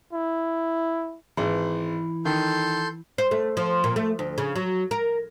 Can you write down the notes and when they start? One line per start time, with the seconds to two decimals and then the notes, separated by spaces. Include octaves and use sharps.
0.13 E4
1.37 G#1 E3
2.25 D#3 A4 C6 G6
3.18 C5
3.31 A3
3.57 F3
3.84 A#2
3.96 A3
4.19 D2
4.38 C#3
4.56 F#3
4.91 A#4